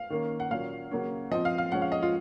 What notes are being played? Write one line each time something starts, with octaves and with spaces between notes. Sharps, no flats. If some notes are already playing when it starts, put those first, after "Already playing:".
Already playing: F5
D#3 A#3 C#4
F#5
A#2 F#3 C#4 F5
C#3 F#3 A#3 C#4
F3 C4 D#5
F5
F5
F3 G#3 C#4 F#5
F5
D#5
F4